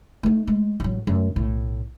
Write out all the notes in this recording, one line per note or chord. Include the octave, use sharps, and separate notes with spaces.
A3 D#4
G#3
A1 F#3
F#2 A3
B1 A2